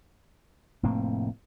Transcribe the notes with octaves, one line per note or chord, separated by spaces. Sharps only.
F1 A2 A#3 C4